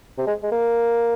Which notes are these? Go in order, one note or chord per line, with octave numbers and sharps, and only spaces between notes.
C3
G#3
G#3
A#3